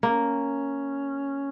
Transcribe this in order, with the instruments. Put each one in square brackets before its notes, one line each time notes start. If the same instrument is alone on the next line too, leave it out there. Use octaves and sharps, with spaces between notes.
[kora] A#3 [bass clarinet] C#4